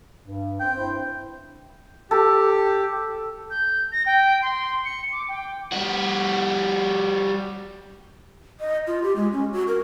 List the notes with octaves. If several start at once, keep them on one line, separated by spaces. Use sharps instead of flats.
G2
C4 G5
G2 E4 C5
G4 A4
G6
A#6
G5
C6
C#7
D6
G5
G3 F#4
D#5
F4
G4
G#3
C#4
F#4
A#4